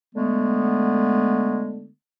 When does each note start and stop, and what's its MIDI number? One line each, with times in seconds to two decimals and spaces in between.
0.15 1.89 50
0.15 1.89 56
0.15 1.89 57
0.15 1.89 59